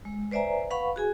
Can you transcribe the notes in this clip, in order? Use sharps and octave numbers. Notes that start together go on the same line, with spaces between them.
G#3
B4 C5 D5 E5 G#5 A#5
B4 F5 F#5 B5 C#6
F#4 G#4 G#5